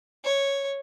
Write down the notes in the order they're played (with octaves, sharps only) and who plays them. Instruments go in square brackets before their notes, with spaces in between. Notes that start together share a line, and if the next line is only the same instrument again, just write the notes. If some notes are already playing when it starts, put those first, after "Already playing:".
[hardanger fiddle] C#5